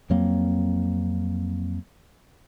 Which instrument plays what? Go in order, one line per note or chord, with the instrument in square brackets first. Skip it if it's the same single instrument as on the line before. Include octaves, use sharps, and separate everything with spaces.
[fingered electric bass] F2 F#3 A#3 C4